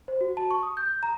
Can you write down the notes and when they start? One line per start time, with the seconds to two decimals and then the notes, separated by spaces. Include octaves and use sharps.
0.08 C5
0.21 F#4
0.37 A5
0.51 C#6
0.63 D#6
0.77 G6
1.03 A#5